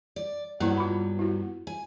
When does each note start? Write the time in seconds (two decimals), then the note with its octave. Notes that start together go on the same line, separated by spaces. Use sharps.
0.16 D5
0.60 G2 F#3 A#3 B3 E4
0.77 F4 B5
1.19 E4 F#4
1.67 G#5